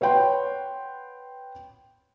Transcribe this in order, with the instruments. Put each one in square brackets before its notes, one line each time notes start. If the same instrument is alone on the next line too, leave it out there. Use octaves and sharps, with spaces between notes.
[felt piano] B4 C#5 F#5 G5 B5 C6